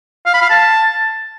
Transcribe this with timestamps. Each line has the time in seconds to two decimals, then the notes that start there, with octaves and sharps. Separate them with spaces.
0.26 F5
0.34 B5
0.42 F5
0.49 A5